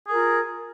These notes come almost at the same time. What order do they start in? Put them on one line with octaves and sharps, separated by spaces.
G#4 A#4 F4